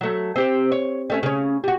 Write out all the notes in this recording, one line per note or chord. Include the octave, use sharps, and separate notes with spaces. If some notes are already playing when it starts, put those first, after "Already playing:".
F#3 A3
C4 G4 C5
C#5
G3 A3 C#4
C#3 C#4
G3 F#4